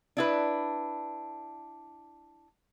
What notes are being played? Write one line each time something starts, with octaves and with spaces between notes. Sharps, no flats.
D4 E4 B4